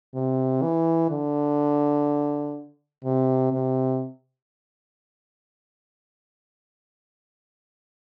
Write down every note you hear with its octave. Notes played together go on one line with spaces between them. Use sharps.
C3
E3
D3
C3
C3